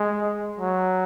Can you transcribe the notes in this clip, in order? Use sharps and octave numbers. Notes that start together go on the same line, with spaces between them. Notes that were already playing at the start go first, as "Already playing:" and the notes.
Already playing: G#3
F#3